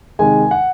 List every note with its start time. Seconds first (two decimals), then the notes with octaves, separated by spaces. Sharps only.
0.19 C3 D#3 G#3 G#5
0.51 F#5